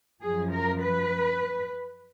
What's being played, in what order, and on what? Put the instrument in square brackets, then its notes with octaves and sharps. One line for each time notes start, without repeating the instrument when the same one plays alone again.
[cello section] F#2 F3 G#4
A#4
B4